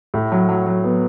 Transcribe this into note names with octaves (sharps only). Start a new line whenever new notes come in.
A2
F#3
F#3
F#3
B3